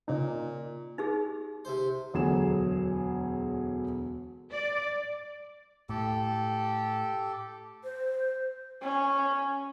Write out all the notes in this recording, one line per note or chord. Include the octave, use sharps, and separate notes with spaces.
A#2 C#3 D#4
D#4 G4 G#4
C3 C5
E1 D2 F#3 G#4 E7
D5
A2 G4 A4
C5
C#4